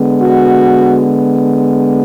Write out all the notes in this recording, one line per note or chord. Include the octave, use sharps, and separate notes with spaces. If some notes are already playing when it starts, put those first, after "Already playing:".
Already playing: D3 G#3 B3
F#4